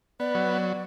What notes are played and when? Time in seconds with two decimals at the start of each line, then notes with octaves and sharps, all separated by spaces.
0.20 B3 D5
0.35 F#3